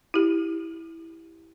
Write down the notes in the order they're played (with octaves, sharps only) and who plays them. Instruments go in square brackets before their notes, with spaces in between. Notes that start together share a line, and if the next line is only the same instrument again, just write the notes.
[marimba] E4 G4